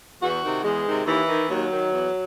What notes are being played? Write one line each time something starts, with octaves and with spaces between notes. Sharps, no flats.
E2 F#4
C3 D#3
E2 G#3
D#3
C3
D#2 E3
D#3
D#2 F#3
D#3
E2